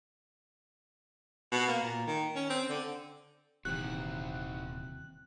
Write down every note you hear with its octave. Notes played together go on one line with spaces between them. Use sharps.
B2
A#3
A#2
D#3
C#4
C4
D3
D#1 D#2 C3 E3 D#4 F#4 G5 F#6